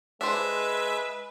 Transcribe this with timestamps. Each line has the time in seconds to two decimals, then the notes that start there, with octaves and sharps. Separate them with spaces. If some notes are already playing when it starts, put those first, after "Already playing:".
0.21 G#3 D4 B4 C5 E5